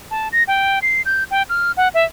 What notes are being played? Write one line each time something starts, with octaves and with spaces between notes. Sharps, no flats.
A5
A#6
G5
C7
G6
G5
F6
F#5
E5